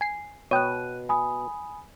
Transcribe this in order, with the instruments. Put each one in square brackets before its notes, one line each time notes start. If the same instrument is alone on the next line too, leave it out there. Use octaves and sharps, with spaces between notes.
[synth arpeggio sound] G#5 C7
[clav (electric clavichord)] B2 [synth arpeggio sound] C#5 G5 [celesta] F#6 D#7
[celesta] G#5 B5 D#6